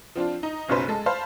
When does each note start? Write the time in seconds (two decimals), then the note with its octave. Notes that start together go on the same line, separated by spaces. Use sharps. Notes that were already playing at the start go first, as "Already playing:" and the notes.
0.15 F3 C4 D4 F4
0.43 D#4
0.68 F#1 B1 F#2 F#3 B4 C5
0.88 G#3 A4
1.06 C5 F5 A5 B5